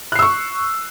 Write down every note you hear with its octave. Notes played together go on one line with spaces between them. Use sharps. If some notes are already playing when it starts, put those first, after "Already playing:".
C#6 E6 F#6 C7